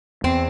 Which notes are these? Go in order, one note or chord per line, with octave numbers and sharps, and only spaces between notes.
E2 C4